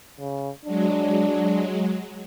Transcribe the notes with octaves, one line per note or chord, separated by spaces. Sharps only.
C#3
F#3 G#3 D4